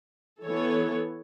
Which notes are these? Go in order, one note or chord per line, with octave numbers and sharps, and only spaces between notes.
E3 B3 A4 C#5